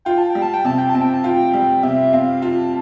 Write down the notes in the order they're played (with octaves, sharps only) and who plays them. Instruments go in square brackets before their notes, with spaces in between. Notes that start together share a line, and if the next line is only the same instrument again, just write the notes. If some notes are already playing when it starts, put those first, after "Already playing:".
[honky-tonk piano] F4 [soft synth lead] G5
[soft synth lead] A5
[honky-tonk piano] G3 [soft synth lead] G5
[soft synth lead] A5
G5
[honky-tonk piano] C3 [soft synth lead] A5
[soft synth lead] G5
A5
[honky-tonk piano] C4
[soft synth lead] G5
A5
[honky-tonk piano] F4 [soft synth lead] G5
[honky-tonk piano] G3
[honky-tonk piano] C3 [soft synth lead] E5
[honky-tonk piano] C4 [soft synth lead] F5
[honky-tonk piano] F4 [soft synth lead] A5